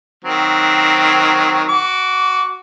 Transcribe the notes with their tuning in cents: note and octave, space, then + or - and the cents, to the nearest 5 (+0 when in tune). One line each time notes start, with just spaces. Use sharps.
D#3 +0 F#3 +0 C4 +0
F#4 +0 D6 -25